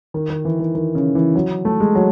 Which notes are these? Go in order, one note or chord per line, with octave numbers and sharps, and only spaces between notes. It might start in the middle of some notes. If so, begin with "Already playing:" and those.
D#3
D#3
E3
D#3
D#3
C#3
E3
F#3
A3
G#3
F#3